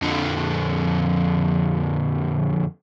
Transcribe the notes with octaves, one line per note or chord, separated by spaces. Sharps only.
F2 D3